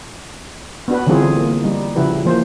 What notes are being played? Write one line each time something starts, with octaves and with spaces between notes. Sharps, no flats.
B3 D4 F#4 B4
D3 E3 G3 C4 F4 G#4
A#3
G3 D#4
C#3 F3 E4 G4 B4
E3 F3 A#3 C5